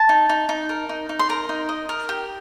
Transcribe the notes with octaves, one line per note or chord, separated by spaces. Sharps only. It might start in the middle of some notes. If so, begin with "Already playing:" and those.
Already playing: A5
D#4
D#4
D#4
A#4
D#4
D#4
C6
A#4 A#5
D#4
D#5
A#4
G4